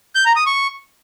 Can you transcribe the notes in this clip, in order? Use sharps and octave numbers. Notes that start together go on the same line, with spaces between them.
G6
A#5
D#6
C#6